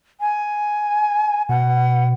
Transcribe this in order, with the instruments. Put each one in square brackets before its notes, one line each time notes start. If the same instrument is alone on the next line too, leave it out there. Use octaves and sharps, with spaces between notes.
[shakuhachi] G#5
[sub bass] B2 [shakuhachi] F#5